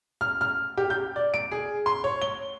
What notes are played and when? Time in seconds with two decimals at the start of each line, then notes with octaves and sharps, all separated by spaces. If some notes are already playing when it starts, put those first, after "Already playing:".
0.21 F6
0.41 F6
0.77 G4
0.90 G6
1.16 D5
1.34 D7
1.52 G#4
1.86 C6
2.04 C#5
2.22 G7